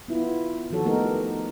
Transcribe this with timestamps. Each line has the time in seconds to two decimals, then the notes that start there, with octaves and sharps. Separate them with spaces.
0.08 B3 E4 F4
0.70 D#3 F3 F#4 A4 C#5
0.85 A3 B3 D#4 G4 A4 A#4